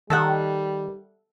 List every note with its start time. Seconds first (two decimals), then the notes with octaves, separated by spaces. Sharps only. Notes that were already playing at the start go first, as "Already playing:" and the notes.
0.10 D#3 G3 A4 E5 F#5